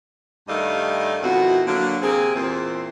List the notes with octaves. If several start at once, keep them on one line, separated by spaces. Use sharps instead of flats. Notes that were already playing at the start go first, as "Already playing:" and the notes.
G2 D#3 G3 A3 D#5 F5
F2 B2 D#3 E4 F#4
D3 F#3 A#3
C3 A#3 C4 G#4
E2 A#2 E3 C4